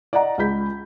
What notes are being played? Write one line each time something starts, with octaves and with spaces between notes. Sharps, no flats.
D5 D#5 F#5 A#5
C#2 G#4 B5 G6 B6